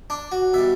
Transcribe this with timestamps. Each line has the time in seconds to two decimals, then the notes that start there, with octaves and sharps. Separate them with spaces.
0.10 D4
0.32 F#4
0.53 B2 G3 E5